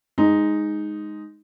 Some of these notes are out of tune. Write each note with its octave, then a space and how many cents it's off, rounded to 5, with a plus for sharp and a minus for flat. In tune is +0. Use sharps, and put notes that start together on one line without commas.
G#3 +0 D#4 +0